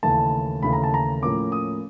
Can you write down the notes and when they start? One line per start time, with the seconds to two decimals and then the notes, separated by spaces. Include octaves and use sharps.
0.03 D#2 C#3 E3 A3 A5
0.63 D#2 C#3 E3 A3 B5
0.73 A#5
0.84 A5
0.94 A#5
1.22 A2 F3 A#3 C#4 D6
1.52 D#6